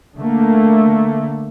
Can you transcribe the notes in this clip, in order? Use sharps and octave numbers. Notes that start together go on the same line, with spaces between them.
D3 A3 A#3